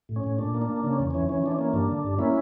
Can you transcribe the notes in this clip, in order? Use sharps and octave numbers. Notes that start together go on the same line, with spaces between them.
A2
C#4
A2
A#2 D4
A#3
D4
A#3
C#3 D4
C#4
E2
E3 C#4
E3 C#4
E3 D4
C#4
A#3
G2 D4
D3
G2
A#3 C#4 E4